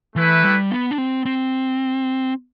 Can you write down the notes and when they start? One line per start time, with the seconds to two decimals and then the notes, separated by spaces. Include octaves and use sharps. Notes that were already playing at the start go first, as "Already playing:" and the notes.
0.15 E3 A3 E4 B4
0.44 G3
0.71 B3
0.91 D4
0.98 C4
1.25 C4